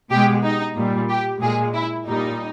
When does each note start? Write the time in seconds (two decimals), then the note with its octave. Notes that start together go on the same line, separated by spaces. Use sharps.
0.10 B2 G#3 G4
0.43 D#4
0.76 A#2 G3
1.09 G4
1.41 A#2 G#3 G#4
1.74 E4
2.08 A#2 G3 D#4